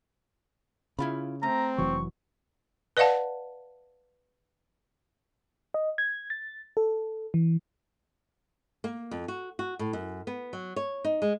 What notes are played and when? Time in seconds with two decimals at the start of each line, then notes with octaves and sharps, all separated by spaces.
0.99 C#3 E4 F4 B5
1.43 A3 C4 A#5
1.78 F1 E3 F#3 C#6
2.97 B4 D5 D#5 F5 F#5 A5
5.74 D#5
5.98 G#6
6.30 A6
6.77 A4
7.34 E3
8.84 A#3
9.11 F2
9.28 F#4
9.59 F#4
9.79 A2
9.93 F#2
10.27 B3
10.53 F#3
10.76 C#5
11.04 D#4
11.22 G#3